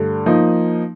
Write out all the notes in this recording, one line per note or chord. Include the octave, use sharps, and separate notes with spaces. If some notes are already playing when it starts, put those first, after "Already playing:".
Already playing: G2 D3 A3
F3 A#3 D#4